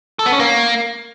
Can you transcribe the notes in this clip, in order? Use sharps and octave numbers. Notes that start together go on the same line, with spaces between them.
A4
B3
C#4
A#3